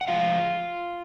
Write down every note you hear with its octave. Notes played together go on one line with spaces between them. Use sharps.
F#5
A2 F3 G#3 F4 F5